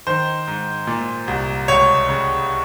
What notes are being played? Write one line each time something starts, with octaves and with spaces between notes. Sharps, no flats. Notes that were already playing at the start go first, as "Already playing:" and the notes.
D#3 C5
G#2
A#2
C2
C#2 C#5
C#3